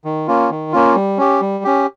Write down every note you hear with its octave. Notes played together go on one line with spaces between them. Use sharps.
D#3
A#3 C#4 F4
D#3
A#3 C#4 F4
G3
C#4 G4
G3
C#4 G4